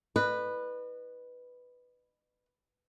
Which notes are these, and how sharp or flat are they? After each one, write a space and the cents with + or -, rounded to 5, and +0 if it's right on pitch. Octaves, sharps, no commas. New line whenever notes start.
B4 +0 D#5 -40